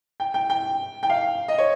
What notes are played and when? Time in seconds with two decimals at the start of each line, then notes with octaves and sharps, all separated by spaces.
0.20 G5
0.34 G5
0.50 G5
1.03 G5
1.10 F5
1.48 D#5
1.58 C#5